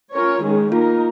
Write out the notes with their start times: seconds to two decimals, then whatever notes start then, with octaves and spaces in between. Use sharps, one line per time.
0.13 C#4 F4 A#4 C#5
0.42 D#3 G#3 C#4 G#4
0.71 A#3 D#4 F4 A#4